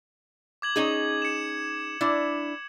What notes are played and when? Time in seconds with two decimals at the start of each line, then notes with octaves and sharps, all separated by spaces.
0.62 D6 G#6 F#7
0.76 C#4 D#4 G#4
1.22 C#7 E7
2.01 D4 E4